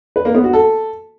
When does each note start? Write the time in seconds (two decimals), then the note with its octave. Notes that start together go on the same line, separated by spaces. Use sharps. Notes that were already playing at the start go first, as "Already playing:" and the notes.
0.16 B4
0.25 A#3
0.35 B3
0.44 F#4
0.53 A4